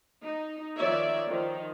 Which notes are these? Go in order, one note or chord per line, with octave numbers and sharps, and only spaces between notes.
D#4
D#3 F3 C#5 D5 E5
D#3 F3